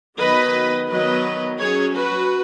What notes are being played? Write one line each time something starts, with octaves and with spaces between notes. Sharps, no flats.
D#3 F#3 B3 B4 D#5
D#3 F#3 B3 B4 D#5
F#3 C#4 G#4 C#5
F#4 B4